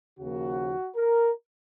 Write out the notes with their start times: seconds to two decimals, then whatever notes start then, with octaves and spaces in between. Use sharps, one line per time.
0.19 D#2 C#3 F3 A#3 F#4
0.95 A#4